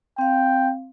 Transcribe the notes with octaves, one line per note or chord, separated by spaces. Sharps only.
C4 F5 G5